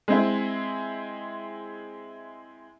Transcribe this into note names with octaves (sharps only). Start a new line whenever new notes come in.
G#3 C4 E4